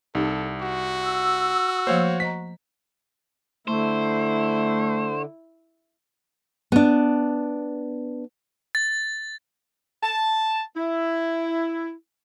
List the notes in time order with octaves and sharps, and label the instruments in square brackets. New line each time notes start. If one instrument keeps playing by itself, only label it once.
[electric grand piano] C2 [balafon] D#4 G4 [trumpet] A4
[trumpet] F#4
[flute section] E6
[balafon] F3 A3 A#3 [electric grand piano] C5 C#5 F5
[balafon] C5 D#5 A#5 [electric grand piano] B6
[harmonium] D3 [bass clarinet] A3 [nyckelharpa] E4 [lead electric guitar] C5
[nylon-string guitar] B3 D4
[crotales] A6
[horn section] A5
E4